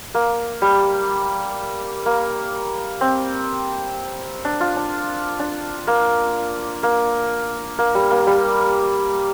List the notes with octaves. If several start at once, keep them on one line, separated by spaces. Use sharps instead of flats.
A#3
G3
A#3
C4
D4
F4
D4
D4
A#3
A#3
A#3
G3
A#3
G3